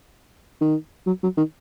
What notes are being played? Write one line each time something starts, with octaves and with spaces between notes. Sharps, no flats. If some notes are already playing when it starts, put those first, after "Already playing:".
D#3
F#3
F#3
D#3